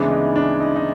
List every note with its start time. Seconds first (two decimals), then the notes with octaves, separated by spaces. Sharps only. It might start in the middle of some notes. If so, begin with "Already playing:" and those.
Already playing: D2 C#3 E3 G#3 B3 D4
0.11 D#4
0.36 D4
0.60 D#4
0.76 D#4